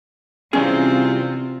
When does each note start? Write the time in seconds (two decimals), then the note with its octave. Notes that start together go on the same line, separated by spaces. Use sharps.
0.53 C3 E3 G3 C4 C#4 F4 G#4